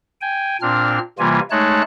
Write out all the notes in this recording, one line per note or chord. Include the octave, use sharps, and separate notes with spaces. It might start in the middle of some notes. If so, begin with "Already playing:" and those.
G5 G#5
A#2 C4 D4 F6
C3 E3 G3 A#3 F4 G#5
G#3 A3 D#4 C#5 A5 F#6